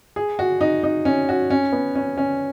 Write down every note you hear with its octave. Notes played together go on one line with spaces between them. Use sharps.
G#4
F#4
D#4
D#4
C#4
F#4
C#4
B3
C#4
C#4